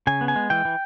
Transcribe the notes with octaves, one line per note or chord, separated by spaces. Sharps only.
C#3 G#5
B3
G#5
G#3
E3 G5
E3